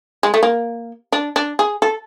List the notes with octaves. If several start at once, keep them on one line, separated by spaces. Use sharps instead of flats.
G#3
A3
A#3
D4
D4
G#4
A4